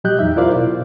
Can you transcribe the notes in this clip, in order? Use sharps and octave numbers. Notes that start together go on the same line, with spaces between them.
A#2 F#3 G4 D#5 F#6 G6
E2 D#4 E5
E4 F4 A#4 C5 D5 F5
B2